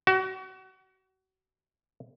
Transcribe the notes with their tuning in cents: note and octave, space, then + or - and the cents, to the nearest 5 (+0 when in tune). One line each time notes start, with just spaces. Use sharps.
F#4 +30